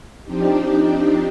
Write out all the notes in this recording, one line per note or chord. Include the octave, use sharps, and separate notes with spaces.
F3 C4 D4 D#4 G4